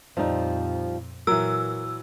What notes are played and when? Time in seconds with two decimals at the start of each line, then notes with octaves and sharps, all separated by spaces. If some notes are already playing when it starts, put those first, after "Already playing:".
0.17 F2 A#2 F3 G3 C4 D#4
1.27 A#2 E3 F#3 A#4 E6